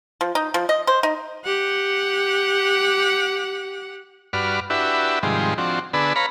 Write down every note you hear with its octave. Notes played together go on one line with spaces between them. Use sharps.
F3
D#4
F3
D#5
C5
D#4
G4 F#5
G2 F#4 B4 D5 F6
D4 E4 F#4 G4 B4 E5
G#2 C3 D#3 F3 G3 G#3
F3 C4 D4 F#4
D3 B3 D4 G#4 B4 E6
B4 C#5 F5 A#5 B5